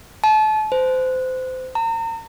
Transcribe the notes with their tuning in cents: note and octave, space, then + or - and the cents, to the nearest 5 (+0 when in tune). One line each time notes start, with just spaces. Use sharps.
A5 -30
C5 -30
A#5 -35